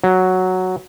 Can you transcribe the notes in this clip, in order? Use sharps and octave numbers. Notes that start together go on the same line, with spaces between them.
F#3